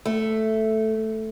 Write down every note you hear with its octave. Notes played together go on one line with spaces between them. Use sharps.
A3